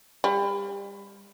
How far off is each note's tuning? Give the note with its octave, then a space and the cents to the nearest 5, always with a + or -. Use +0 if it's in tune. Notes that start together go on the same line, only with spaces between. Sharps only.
G3 +30